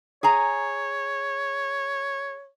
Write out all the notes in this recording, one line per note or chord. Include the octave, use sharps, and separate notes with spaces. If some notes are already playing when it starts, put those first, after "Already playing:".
G#4 C#5 G#5 A#5